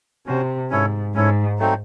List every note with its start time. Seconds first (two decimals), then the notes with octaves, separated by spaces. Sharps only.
0.26 C3 C#4 F#4 C5
0.70 G#2 C#4 E4 A4 C#5
1.14 G#2 C#4 E4 A4 C#5
1.59 F#3 A3 C4 D#4